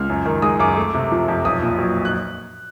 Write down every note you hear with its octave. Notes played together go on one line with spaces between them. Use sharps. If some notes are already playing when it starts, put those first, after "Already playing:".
Already playing: C#2 F6
F#2
D#3
G#3 D#6
F#2 D6
A3
C3
F3
F2
B1 D#6
A#2
F#3
F#6